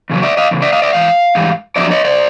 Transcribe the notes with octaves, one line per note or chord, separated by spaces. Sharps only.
E2 C#3 F#3
D5 E5
D#5 F5
E2 C#3
D5 E5
D#5 F5
D5 E5
G#2 E3 F5
G#2 E3 G3
F2 D3 F#3 D5 E5
C#5 D#5
C5 D5